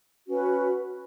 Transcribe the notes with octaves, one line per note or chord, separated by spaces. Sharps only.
C#4 F#4 B4